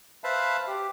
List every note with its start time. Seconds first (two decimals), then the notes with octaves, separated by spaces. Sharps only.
0.24 B4 C5 E5 F5 A5 B5
0.68 G4